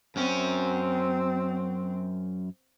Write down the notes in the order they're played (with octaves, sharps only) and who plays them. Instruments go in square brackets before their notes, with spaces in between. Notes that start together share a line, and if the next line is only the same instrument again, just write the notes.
[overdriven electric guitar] F#2 C#4 [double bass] C4